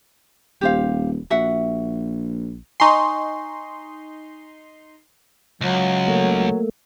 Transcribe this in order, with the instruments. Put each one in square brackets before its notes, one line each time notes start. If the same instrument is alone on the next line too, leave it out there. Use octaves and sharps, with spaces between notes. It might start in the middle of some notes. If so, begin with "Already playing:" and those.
[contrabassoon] D#1 [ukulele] G4 C5 F5
[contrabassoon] A#1 [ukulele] F#4 E5 F#5
[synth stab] D#4 C6 [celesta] G#5 C#6
[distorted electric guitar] C#2 [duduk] F#3
[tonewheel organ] A3 A#3